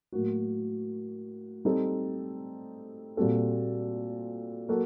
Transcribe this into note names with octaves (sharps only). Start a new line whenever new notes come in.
A2 F#3 A#3 F#4
G3 C4 D#4 A4
A#2 G3 C4 F#4 A4
F#3 A#3 F#4 A4